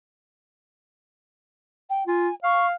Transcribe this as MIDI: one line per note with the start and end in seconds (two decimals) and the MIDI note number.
1.89 2.03 79
2.07 2.29 65
2.07 2.34 80
2.44 2.74 77
2.44 2.66 85